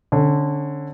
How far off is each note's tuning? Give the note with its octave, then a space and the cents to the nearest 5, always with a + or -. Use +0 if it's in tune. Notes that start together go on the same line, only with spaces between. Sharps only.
D3 +0 C#4 -25